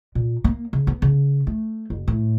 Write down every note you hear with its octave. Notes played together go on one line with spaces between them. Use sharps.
A#2
A#3
C#3
B3
C#3
A3
F#1
A2